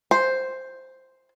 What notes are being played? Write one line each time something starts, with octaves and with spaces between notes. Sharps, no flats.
C5